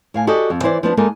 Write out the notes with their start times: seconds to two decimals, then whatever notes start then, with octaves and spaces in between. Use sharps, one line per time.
0.14 A2 F5 G#5
0.27 F#4 G4 A4 D5 D#5
0.50 F2
0.63 E3 E4 C5 D5
0.83 F3 B3 D4
0.97 G#3 A#3 D#4 A4 A#4